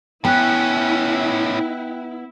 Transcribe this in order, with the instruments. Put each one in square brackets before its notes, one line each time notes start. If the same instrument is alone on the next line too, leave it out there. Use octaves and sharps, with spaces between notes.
[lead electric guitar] A2 C#4 [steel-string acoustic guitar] B3 [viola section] E4 [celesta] G5 F#6